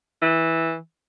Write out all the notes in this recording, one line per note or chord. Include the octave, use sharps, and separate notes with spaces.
E3